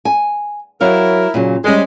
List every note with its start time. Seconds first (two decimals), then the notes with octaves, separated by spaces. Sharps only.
0.05 G#5
0.81 F#3 E4 A#4 C#5 F5
1.34 A#2 C#3 F#3
1.64 G3 G#3 C#4 C5